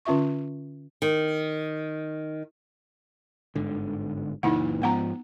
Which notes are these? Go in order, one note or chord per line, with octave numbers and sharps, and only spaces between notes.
D3 C#4 F4 E5 C#6
D#3
G1 G#2 D3
F#1 A#2 E3 D#4 E4 F#5
G#2 F3 B3 F#5 A#5